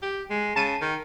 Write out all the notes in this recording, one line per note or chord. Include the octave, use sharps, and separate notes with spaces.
G4
G#3
C#3 A5 D#7
D#3